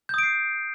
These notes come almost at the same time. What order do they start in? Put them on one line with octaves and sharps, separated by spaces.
G6 D#6 D7 C7